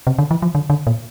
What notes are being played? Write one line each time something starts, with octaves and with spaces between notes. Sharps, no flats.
C3
D3
E3
F3
D3
D3
A#2